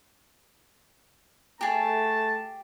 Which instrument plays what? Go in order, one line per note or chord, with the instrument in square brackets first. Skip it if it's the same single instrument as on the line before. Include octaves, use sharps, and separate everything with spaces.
[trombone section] A3 [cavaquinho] G4 G#4 [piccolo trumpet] A5